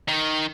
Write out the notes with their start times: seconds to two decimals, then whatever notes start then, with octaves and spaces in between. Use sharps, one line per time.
0.08 D#3